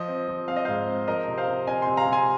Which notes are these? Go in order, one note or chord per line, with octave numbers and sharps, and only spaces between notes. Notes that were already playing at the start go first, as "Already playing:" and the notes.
Already playing: F3 D#5
C4
F3
C4 F5
D#5
G#2 C5 F5
C4
F3 A#4 D#5
C3
C5 F5
C3
C3 D#5 G#5
C3 G#5 C6
F5 A#5
C3
G#5 C6